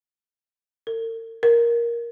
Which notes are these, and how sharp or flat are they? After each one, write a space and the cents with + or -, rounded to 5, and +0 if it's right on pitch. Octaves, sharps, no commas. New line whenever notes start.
A#4 -45
A#4 +10